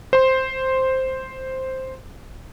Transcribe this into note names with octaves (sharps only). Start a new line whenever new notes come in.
C5 C6